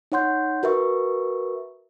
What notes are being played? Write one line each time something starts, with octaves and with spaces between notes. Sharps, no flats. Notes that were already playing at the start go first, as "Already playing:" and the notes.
D#4 C#5 F#5 C6 G6
F#4 A#4 B4 E5 C#6